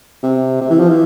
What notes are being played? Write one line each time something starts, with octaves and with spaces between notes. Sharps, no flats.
C3
C3
E3
F3
E3